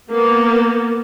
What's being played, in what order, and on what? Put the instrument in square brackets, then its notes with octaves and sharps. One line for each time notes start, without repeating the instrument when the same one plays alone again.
[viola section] A#3 B3